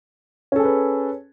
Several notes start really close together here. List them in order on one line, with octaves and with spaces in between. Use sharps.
C#4 A4 G#4 B4